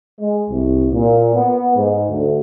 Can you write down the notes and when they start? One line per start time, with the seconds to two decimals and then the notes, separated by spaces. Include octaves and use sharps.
0.20 G#3
0.49 C2
0.91 A#2
1.34 B3
1.76 G#2
2.09 D2